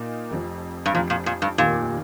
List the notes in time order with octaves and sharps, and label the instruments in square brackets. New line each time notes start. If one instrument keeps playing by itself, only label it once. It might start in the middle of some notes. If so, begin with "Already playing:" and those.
Already playing: [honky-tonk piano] A#2 A#3 D#4
F1 F2 F3
[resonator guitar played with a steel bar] G2
[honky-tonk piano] F1 F2 F3 [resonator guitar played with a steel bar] A#2
[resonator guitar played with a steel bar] A#2
A#2
G2
[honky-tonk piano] F1 D#2 D#3 A#3 [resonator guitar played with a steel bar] A#2